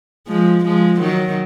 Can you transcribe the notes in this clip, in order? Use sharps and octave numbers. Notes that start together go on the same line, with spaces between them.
F3 G#3
F3 G#3
D#3 F#3